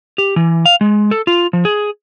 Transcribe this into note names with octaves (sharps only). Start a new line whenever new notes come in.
G4
E3
F5
G#3
A4
F4
F3
G#4